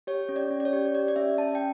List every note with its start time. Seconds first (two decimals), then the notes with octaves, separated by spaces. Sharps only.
0.07 G4 C#5
0.29 C#4
0.36 D5
0.51 C#4
0.60 D5
0.65 C#5
0.73 G4
0.95 G4 D5
1.08 D5
1.16 C#4 E5
1.38 C#4 A5
1.55 G5